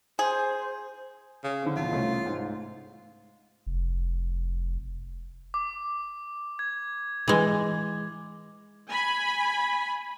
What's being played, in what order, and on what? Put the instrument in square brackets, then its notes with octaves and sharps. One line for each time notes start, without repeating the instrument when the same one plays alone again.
[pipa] G#4 [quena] C5
[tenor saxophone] C#3
[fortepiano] D3 C4
[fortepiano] B1 E2 [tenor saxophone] F4
[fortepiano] C2 A3 C#4
G#2
[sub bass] F1
[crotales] D6
G#6
[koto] E3 G#3
[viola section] G#5 B5